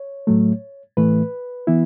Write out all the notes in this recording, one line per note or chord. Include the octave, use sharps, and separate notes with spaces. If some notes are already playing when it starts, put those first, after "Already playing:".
Already playing: C#5
A2 F#3 A3
A2 E3 A3 B4
E3 B3 E4